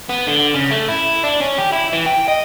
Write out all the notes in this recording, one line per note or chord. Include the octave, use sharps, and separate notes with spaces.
B3
D3
C#3
A3
E4
D4
C#4
G4
E4
E3
G5
D#5